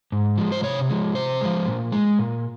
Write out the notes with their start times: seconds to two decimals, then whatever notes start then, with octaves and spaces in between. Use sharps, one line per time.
0.12 G#2
0.37 F3 G#3
0.52 C5
0.63 C3 C#5
0.89 F3 G#3
1.15 C3 C5
1.41 F3 G#3
1.68 A#2
1.92 G#3
2.19 A#2